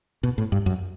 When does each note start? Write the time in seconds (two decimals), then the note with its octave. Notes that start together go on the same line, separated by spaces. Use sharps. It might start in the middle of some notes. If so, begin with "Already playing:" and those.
0.23 B2
0.38 A2
0.52 G2
0.66 F#2